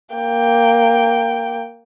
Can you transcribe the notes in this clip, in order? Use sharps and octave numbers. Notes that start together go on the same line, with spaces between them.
A#3 G5